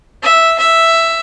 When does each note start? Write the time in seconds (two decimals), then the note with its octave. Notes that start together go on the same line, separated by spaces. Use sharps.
0.23 E5
0.58 E5